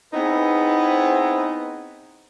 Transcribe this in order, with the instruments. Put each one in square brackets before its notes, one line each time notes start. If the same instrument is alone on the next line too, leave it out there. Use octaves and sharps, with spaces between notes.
[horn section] B3 C4 D#4 E4 G#4 B4